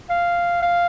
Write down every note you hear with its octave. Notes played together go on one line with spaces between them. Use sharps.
F5
F5